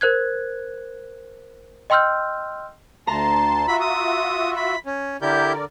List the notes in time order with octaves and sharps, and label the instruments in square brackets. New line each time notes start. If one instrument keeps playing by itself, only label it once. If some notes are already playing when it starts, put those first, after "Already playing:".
[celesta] A#4 C5 F#6 G#6
D#5 G5 C6 E6 F6 G6
[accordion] D2 A5 C6 [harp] A#5
[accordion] F4 F#4 E5 [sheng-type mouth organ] B5
[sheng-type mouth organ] D#6
B5
C#4
[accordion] D3 A#4 D5 [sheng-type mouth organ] E4 G4 G6